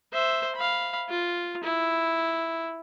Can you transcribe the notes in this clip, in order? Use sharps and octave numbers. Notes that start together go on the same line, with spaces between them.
C5 E5
F5 B5
F4
E4